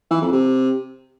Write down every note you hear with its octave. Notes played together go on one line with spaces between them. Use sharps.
E3
F2
C3